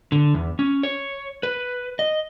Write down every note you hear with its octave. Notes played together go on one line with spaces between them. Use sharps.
D3
E2
C#4
C#5
B4
D#5